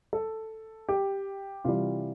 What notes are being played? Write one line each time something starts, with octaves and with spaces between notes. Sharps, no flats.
A4
G4
C3 E3 G3 F4